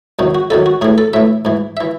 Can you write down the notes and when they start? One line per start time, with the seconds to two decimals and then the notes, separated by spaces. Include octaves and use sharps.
0.19 E2 C3 D#3 F#3
0.35 F#4
0.50 E2 C3 D#3 F#3 A4
0.66 F#4
0.81 A2 G#4
0.85 E3
0.98 A4
1.13 A2 E3 E5
1.45 G#2 E3
1.77 E5
1.81 E3